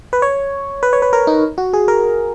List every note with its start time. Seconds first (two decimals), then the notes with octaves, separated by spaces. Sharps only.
0.13 B4
0.22 C#5
0.83 B4
0.93 C#5
1.02 B4
1.13 A#4
1.27 D#4
1.58 F#4
1.73 G#4
1.88 A#4